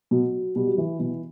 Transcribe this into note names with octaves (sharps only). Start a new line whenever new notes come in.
B2 F#3
B2 G3
F#3
E3
B2 E3